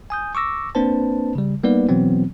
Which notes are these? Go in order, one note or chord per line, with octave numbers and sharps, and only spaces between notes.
G#5 D#6 G6
C#6 D6 E6 A#6
A#3 C4 D4 B4 C5 A5
C#3 G3
G3 A#3 B3 D#4 B4 D5
B2 E3 F#3 B3 C4